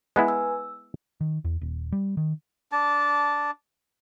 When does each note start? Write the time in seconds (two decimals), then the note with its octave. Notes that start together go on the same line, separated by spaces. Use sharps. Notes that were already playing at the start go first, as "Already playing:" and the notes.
0.16 G#3 B3 E4 B4 G#5
0.28 E6
1.21 D#3
1.45 E2
1.61 D#1
1.92 G3
2.17 D#3
2.72 D4 A5